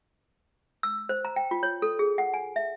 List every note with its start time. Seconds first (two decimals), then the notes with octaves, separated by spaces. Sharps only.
0.83 E6
1.09 C5
1.25 A#5
1.36 G5
1.51 F4
1.63 C#5
1.82 A4
1.99 G#4
2.18 F#5
2.34 G#5
2.56 E5